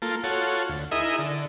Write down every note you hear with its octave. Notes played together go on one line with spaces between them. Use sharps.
A#3 F4 A4
F4 F#4 A4 C#5
D2
D#4 E4 G#4 A#4 D#5 E5
D3